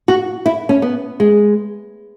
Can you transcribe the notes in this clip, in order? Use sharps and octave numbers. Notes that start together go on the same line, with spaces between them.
F#4
E4
C#4
B3
G#3